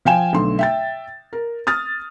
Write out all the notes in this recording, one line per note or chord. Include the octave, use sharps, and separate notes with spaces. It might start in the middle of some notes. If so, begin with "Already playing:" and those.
F3 F5 G5 G#5 E7
B1 D3 A3 C6
E5 G5 A6
A#4
D#6 F6 A6